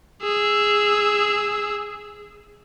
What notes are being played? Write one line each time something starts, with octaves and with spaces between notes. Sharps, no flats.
G#4 E6